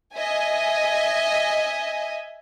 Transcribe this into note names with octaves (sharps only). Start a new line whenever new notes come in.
D#5 E5 G#5